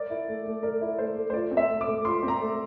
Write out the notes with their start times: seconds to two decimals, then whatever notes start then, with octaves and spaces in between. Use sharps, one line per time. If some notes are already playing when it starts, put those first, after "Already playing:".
Already playing: A#4 D5
0.10 E4
0.28 A3
0.46 A3
0.63 A#4 D5
0.81 E4
0.98 A3 C5
1.16 A3
1.30 C5
1.33 F4 D5
1.51 C4
1.57 E5
1.70 A3
1.81 D6
1.87 A3
2.05 F4 C6
2.23 C4
2.28 A#5
2.41 A3